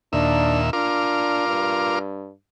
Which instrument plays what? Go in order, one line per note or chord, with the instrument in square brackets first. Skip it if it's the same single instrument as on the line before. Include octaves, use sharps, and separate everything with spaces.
[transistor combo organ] D#2 A#2 E5 [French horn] D4
[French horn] D4 [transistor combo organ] F4 A#4 D6
[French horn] G2